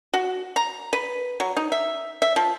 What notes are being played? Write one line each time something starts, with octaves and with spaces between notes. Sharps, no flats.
F#4
A#5
B4
F#3
D#4
E5
E5
F3